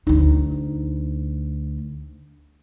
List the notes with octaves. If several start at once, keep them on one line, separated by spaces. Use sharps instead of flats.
D2 D#4